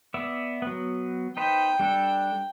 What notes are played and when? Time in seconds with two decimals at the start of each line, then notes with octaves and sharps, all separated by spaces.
0.14 B3 D5 E5
0.62 F#3 B3
1.37 D#4 B4 C5 G5
1.79 G3 D4 A4